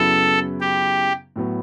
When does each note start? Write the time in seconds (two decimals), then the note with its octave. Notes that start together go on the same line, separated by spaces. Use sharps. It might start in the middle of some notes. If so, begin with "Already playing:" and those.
Already playing: F#2 C#3 F#3 B3 E4 A4
0.61 G4
1.36 A2 F#3 B3